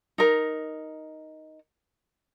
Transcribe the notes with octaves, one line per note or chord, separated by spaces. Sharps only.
D#4 A#4